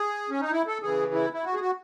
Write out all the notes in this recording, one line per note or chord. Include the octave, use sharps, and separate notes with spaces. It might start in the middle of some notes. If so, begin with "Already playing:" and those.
Already playing: G#4
C#4
D#4
E4
A4
C#3 E3 G#4
E4
E4
F#4
G#4
F#4